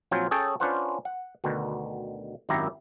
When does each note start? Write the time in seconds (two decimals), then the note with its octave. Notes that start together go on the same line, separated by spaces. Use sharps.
0.11 A#1 F#3 C4 F4 G5 G#5
0.31 C#4 G#4 A4 C#5 G5 A5
0.60 C#4 D4 F4 B4 C5 F#5
1.05 F#5
1.44 D2 B2 D3 D#3
2.49 G#1 F#2 D#3 E4 G4 A#5